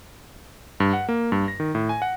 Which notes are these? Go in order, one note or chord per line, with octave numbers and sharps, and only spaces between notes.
G2
F#5
A#3
G2
A#6
D#3
A2
G#5
F#5